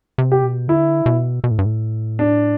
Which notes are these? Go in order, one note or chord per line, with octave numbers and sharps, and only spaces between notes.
C3
G4
B2
D3 E4
B2
B2
A2
G2
A2
D4